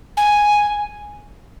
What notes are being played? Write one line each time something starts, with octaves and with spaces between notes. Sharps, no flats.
G#5